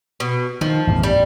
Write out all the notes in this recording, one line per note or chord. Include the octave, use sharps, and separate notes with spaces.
B2
D#3 F3
A1 E2 G2
G3